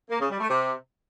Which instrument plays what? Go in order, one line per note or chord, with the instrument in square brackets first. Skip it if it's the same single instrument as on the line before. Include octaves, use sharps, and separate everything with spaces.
[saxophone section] A#3
C#3
G3
A3
C3